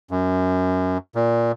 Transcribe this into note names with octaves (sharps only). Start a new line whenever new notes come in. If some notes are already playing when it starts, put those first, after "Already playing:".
F#2
A#2